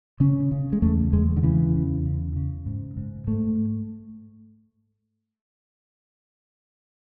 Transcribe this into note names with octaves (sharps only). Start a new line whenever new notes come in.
C#3 C#4
C#3
G#3
E2 A3
E2 G#3
D3
C#3 E3
E2
C#3
C#3
G#2
G#2
G#2 A3